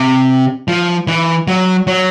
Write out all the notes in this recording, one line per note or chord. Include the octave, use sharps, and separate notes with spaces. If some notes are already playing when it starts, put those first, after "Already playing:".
Already playing: C3
F3
E3
F#3
F#3